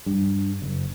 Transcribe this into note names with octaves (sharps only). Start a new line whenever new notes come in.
G2
F#1